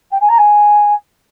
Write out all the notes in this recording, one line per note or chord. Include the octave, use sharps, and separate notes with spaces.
G5
G#5
A#5
G#5